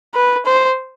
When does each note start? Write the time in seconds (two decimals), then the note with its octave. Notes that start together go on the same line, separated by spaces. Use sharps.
0.15 B4
0.46 C5